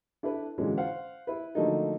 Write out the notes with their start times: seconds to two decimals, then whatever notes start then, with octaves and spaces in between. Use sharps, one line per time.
0.23 D4 E4 A4 B4
0.58 A#2 D3 E3 G#3 C#4 F#4
0.77 C5 F5 F#5
1.27 E4 B4
1.55 D3 F3 F#3 A3 A#3 D#4